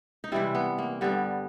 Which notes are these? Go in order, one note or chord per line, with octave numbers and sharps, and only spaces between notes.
D#4
C3 E3 G3 E4
B3
A#3
G2 D3 G3 B3